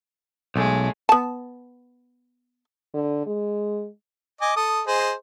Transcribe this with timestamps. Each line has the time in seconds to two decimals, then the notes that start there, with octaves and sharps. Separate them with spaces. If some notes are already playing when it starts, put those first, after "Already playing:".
0.56 B1 G#3 A3
1.09 B3 A5
2.94 D3
3.26 G#3
4.41 D#5 G#5 D6
4.56 A4 D#6
4.87 G#4 C5 D#5